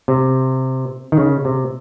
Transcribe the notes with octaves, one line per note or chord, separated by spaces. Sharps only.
C3
D#3
C#3
C3